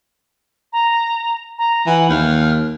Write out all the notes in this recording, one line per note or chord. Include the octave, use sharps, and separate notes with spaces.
A#5
A#5
E3 F#5
D#2 F6